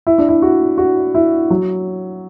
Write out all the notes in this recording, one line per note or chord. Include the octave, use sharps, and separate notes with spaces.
E4
D4
E4
F#4
F#4
E4
F#3